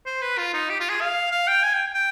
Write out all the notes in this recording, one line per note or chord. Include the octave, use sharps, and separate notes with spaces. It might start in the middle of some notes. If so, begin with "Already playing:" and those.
C5
B4
F4
D#4
G4
F4
G#4
F5
F5
G5
G#5
G5
G5